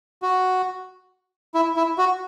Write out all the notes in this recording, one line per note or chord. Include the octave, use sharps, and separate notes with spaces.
F#4
E4
E4
F#4